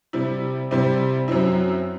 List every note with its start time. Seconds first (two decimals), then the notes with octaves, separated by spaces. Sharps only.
0.13 C3 G3 C4 E4
0.71 C3 G3 C4 E4
1.28 F#2 F#3 C4 E4